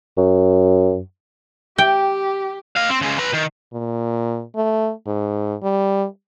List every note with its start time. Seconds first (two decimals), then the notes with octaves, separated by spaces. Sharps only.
0.17 F#2
1.78 G4 G5
2.76 D#5 F5
2.89 C4
3.01 C#3 G#3
3.18 B4 A#5
3.33 D#3
3.73 A#2
4.56 A3
5.07 G#2
5.63 G3